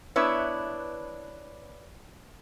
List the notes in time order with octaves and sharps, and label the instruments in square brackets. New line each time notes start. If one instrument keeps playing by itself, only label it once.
[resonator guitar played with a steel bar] B3 D4 E4 B4 C#5